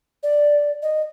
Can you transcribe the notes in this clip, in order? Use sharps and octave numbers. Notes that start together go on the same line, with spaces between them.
D5
D#5